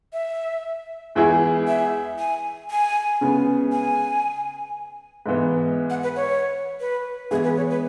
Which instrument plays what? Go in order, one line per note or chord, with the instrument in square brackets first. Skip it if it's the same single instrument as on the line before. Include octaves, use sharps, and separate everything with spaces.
[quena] E5
[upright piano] E2 E3 G#3 E4 G#4
[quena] E5
G#5
G#5
[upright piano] C#3 G#3 B3
[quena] G#5
[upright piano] G#2 E3 B3
[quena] F#5
B4
C#5
B4
[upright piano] E3 G#3 B3 [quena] G#4
[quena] B4
C#5
B4